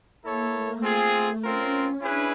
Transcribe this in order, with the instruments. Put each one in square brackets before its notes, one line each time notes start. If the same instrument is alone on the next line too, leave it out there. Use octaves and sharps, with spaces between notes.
[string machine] A#3 [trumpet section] E4 A4 C#5
[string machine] A3
[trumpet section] C4 F4 G#4
[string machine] A3
[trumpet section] C4 F4 A#4 [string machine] C#4
[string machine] C#4
[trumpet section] C#4 E4 G#4 B4 [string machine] D4